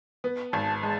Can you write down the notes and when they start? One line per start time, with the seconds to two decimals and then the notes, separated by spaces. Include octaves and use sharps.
0.24 B3
0.53 G#1 A5
0.83 G#3 A5